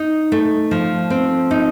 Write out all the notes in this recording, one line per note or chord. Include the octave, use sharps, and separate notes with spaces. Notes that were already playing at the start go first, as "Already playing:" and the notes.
Already playing: D#4
A3
F3
C4
D#4